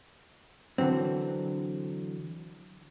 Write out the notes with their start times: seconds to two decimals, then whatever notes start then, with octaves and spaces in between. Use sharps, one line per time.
0.78 D3 E3 F#3 C4